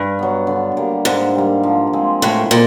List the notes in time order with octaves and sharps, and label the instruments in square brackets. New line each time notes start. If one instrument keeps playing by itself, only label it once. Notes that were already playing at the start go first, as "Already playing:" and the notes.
Already playing: [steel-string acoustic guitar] G2
[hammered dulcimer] F#3 B3
D3
G3 A#3
[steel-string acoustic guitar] G#2 [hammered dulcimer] D3
[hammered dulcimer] G3 A#3
F3
G#3 C4
[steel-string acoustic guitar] A2 [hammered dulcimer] F3
[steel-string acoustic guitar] A#2 [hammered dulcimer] G#3 C4